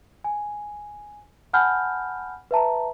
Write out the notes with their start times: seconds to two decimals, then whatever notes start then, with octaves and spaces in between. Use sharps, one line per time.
0.24 G#5
1.53 F#5 G#5 A5 B5 F6 G6
2.51 B4 E5 A5 A#5